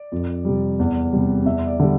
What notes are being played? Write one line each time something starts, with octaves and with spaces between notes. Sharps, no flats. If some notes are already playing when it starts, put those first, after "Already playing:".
Already playing: D5
F2
C3 G3
E2
C3 G3
E2 E5
D5
D3 G3